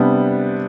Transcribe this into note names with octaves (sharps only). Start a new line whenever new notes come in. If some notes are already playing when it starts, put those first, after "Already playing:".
Already playing: C3 G3 B3 D4